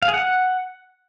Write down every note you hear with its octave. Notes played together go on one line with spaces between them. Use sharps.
F5
G#4
F#5